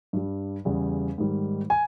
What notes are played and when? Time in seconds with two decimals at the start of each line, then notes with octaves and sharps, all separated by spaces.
0.13 G2 G3
0.65 E2 C#3 G3
1.18 G#2 D#3 G3
1.70 G#5